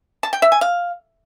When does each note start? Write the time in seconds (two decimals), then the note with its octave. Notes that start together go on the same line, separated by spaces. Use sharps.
0.23 A5
0.33 G5
0.42 E5
0.52 G#5
0.61 F5